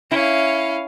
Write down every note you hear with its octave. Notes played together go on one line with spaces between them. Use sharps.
C#4 E4 F5